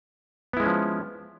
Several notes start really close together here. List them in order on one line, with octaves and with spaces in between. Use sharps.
B3 E4 G#3 C#4 F3